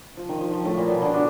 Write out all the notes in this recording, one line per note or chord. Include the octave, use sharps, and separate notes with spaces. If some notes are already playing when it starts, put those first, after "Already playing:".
F3
D#3
F3
F3
A2 A3
A#2 A#3
B2 B3
D3 D4
D3 D4